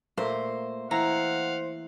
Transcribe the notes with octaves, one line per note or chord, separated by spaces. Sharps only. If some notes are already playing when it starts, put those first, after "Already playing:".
A#2 A3 A#3 C5
E3 C5 F5 F#5 A#5